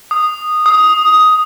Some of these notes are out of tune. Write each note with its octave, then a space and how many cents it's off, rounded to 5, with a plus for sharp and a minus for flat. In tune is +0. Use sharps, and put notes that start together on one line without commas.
D#6 -10
D#6 +10